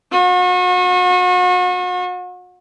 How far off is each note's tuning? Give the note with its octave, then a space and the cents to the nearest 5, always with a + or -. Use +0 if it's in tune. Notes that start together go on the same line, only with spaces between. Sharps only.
F#4 -40